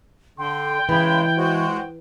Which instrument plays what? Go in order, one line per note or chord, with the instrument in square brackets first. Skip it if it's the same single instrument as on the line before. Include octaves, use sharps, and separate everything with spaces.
[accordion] D3 [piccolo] G5 [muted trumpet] C6
[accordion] C#3 G#3 [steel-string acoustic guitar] E3 [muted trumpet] B5
[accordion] G#3 F#4 [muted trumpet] C5